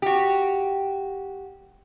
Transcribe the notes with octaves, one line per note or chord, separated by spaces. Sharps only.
F#4 G4